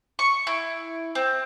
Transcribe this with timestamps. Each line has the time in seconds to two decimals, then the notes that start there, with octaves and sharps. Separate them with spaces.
0.19 C#6
0.47 E4
1.15 C4